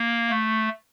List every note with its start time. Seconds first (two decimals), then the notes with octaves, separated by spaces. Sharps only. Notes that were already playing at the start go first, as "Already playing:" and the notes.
Already playing: A#3
0.30 A3